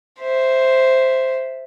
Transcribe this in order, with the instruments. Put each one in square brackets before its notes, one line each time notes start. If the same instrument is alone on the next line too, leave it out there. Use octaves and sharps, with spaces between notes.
[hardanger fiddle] C5 E5